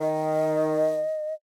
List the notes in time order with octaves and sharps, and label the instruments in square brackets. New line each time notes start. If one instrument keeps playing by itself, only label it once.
[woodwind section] D#3 [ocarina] D#5